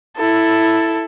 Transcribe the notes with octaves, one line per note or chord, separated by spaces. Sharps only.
E4 A4